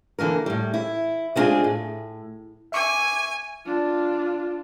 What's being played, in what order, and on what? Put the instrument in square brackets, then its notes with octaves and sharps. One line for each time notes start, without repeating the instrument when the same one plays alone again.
[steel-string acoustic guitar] D3 E3 A#3 A#4
A2 G3
E4
G#3 B3 C4 D4 F4 G#4
A2
[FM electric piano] E5 C#6 D6 [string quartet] G#5
[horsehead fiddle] D4 F4